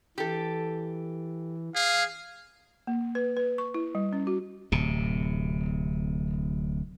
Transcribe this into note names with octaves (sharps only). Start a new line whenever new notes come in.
E3 G4 A4
G#4 F5
A#3
B4
B4
C#6
E4
G3
C#4
F#4
D1 C3